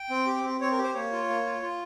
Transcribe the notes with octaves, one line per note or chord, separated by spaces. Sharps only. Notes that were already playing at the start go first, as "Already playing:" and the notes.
Already playing: G5
C4
G4
C4
C4 C#5
A#4
G4
C5
A#3 C#5
F4
A#3
F4
F4